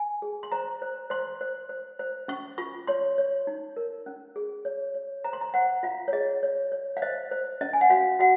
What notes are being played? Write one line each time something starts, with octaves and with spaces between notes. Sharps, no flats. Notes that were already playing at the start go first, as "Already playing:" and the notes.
Already playing: G#5
G#4
C6
C5 A#5
C5
C5 C6
C5
C5
C5
C#4 C#6
F4 C#6
C#5 C6
C#5
D#4
A#4
C#4
G#4
C#5
C#5
C5 A#5
C6
A#5
C5 F#5
F4 F5
C#5
G#4 D#5
C#5
C#5
F5
C5 D#5
C5
C#4 D#5
G#5
F#5
F#4 F5
F#4 F#5